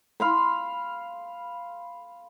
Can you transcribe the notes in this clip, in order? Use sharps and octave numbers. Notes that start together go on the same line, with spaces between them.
F5 B5 C6